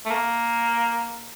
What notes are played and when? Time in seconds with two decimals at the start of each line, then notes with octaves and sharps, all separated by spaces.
0.06 A3
0.11 A#3